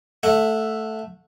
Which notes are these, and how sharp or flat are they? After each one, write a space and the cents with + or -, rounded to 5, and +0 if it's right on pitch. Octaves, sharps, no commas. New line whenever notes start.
A3 +0 F#5 -25